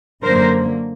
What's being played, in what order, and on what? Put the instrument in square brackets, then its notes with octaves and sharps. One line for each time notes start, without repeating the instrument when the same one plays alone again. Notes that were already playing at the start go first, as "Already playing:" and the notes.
[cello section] F#2 D3 F#3 A#3 A#4 C5